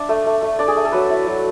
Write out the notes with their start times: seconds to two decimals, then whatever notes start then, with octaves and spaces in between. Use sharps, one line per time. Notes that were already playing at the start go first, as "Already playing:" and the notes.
Already playing: D4 E5
0.09 A3
0.26 A3
0.42 A3
0.59 D4 D5
0.68 G#4
0.77 A3
0.85 A4
0.92 F#3 B4
1.10 E4
1.27 F#3